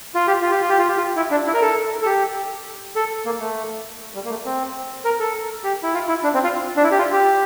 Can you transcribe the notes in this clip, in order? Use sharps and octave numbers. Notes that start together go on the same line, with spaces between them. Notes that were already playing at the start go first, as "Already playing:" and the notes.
F4
G4
F4
G4
F4
G4
F4
G4
F4
E4
D4
E4
A#4
A4
A4
G4
A4
A#3
A3
G3
A#3
A3
C4
A#4
A4
G4
E4
F4
E4
D4
C4
F4
D4
E4
G4
F4
G4